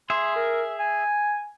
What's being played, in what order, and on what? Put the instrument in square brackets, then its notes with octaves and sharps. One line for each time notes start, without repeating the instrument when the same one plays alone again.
[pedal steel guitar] G#4 E5 [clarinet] C6
[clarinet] A#4
G#5